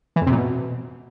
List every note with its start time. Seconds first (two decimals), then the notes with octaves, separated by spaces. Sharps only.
0.16 E3
0.21 F2
0.26 C3
0.32 A#2
0.37 B2